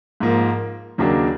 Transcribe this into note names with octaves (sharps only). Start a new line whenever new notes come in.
G#2 F3 A#3
D#2 C#3 F#3 A#3 D4